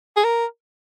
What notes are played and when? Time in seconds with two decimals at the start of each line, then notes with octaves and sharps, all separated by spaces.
0.16 G#4
0.24 A#4